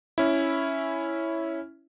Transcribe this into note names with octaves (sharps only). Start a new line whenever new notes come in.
C#4 E4